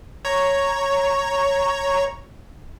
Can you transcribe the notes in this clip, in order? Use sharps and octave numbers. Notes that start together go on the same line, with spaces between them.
C#5 A#5 C#6